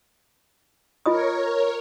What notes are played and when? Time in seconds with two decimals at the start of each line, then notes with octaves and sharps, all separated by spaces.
1.06 F4 A#4 C#5 D#5 D#6